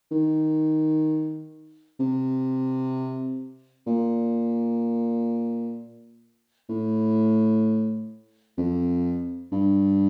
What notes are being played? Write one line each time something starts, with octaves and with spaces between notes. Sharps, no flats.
D#3
C3
A#2
A2
F2
G2